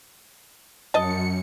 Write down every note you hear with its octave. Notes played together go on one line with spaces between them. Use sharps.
F#2 D#5 A5 C#7